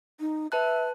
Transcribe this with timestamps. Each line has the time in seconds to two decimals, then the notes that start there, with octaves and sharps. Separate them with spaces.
0.20 D#4
0.52 B4 E5 A5 F#6